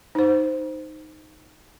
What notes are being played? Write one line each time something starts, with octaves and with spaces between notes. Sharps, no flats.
D#4 C5